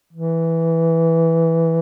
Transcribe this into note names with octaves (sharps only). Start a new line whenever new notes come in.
E3